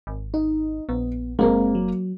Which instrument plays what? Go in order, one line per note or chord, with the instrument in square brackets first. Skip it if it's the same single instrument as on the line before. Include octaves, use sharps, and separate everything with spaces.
[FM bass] G#1
[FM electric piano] D#4 [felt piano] D#5
[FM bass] A#1 [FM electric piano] B3
[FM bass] F#1 [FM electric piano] G#3 C4 [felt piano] A#3 A#4
[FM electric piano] F#3